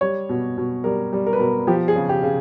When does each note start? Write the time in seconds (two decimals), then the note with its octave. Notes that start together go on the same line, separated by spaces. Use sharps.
0.01 G3 C#5
0.29 B2
0.57 B2
0.84 G3 A#4
1.13 G3
1.27 A#4
1.33 B4
1.39 B2 A#4
1.67 F3 G4
1.88 G#4
1.95 C#3
2.09 G4
2.23 C#3